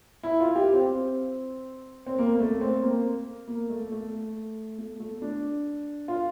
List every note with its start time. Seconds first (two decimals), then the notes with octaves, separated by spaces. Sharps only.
0.23 E4
0.41 F4
0.56 G4
0.73 C4
2.06 C4
2.19 A#3
2.35 A#3
2.40 A3
2.61 C4
2.83 A#3
3.48 A#3
3.70 A3
3.92 A3
4.79 A3
5.00 A3
5.22 D4
6.08 F4